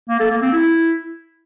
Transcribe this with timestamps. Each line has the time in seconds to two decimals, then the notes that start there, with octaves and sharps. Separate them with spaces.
0.09 A#3
0.20 A4
0.31 A#3
0.42 C4
0.53 E4